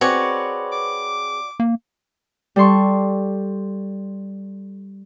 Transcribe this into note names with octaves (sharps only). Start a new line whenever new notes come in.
C4 F#4 G#4 B4 C#5 D5
D6
A#3
G3 A4 C6 C#6